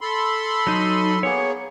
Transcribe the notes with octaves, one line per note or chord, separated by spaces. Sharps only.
A4 B5 C6
F#3 D#4
A#3 B3 G#4 C#5